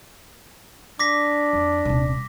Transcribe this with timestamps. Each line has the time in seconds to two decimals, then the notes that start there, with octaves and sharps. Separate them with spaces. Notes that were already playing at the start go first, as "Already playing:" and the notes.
0.99 D4 D6 A#6 B6
1.53 F2
1.85 D#1 C3